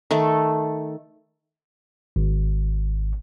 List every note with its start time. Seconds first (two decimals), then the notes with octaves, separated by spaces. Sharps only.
0.11 D#3 A3 A4
2.16 G#1